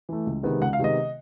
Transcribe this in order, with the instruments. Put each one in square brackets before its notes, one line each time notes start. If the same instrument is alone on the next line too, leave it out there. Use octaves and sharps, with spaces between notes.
[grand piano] E3 A3
C#2
C3 D#3 G#3 B3
C#2 F#5
F5
C3 D#3 G#3 B3 D#5